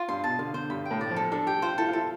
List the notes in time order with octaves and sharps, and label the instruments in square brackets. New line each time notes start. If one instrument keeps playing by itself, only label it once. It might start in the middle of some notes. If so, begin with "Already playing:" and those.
Already playing: [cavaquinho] F4
[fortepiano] G2 [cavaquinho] C6
[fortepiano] B2 [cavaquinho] A5
[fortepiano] D3 [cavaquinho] F5
[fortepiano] D3 [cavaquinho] C5
[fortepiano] G2 [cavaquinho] B5
[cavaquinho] G5
[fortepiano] A2
[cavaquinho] D5
[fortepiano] F3
[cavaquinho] A4
[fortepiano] D4 [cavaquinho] A4
[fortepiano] G4 [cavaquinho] G5
[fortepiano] F4 [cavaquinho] C5
[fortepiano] E4 [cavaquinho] A4
[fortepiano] F4
[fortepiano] E4 [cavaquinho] A4